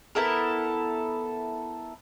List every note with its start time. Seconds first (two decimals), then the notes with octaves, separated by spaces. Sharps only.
0.15 B3 E4 A4 A#4